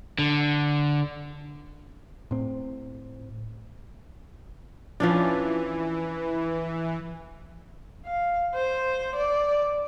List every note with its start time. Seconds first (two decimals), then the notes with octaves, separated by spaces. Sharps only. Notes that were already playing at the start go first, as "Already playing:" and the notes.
0.19 D3
2.31 A2 C4
5.00 E3 F3 C#4 D4
8.06 F5
8.54 C5
9.16 D5